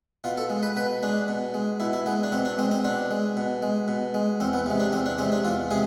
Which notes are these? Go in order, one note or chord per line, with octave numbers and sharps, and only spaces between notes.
B2 F4
A4
G#3
B4
B2 B4
G#3 D4
B2
G#3
B2 E4
E4
G#3 B3
D4
B2 C4
D4
G#3 C4
C4
B2 D4
G#3
B2
G#3
B2
G#3
E2 C4
B3
C3 G#3
D4
E2 C4
D4
C3 G#3 C4
D4
E2 F4
C3 G#3 G#4